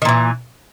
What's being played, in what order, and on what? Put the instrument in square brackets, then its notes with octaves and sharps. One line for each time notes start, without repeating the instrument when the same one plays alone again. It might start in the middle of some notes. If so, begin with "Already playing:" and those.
[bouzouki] D#3
A#2
E3